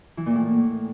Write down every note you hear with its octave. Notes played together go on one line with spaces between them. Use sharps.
E3
A#2
A2